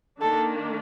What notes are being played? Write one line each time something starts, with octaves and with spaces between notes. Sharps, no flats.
D#3 A#3 D4 A4